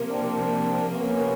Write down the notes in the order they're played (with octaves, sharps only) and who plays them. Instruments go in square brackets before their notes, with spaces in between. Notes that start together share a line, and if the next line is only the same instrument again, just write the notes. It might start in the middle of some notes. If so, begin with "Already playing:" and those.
Already playing: [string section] C3 F3 A#3
[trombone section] C4 D4
B3 C#4